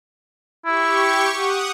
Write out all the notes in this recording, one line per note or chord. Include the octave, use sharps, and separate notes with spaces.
E4 G4 C#6
F#5 D#6